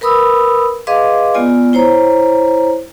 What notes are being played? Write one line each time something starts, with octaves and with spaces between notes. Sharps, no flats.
A#4 B4 B5 D#6 E6
G#4 B4 D#5 F5 C6 D6
G#3 B3 F4 D5 G#5
E4 C5 C#5 A#5